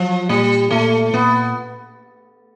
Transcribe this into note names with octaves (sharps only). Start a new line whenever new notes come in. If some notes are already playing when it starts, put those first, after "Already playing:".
Already playing: F3 F#3
A#2 G3
A#2 A3
A#2 B3